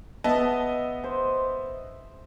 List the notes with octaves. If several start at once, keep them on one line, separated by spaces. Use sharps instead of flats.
B3 D#5 E5 A5
C5